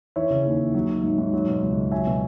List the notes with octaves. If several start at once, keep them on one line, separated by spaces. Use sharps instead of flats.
E3 C#5 E5
C#3
D#2
D#2
F#3
D#3
G#2
G#2
F#3
B2
C#2
C#2
F#3 E5 G#5
B2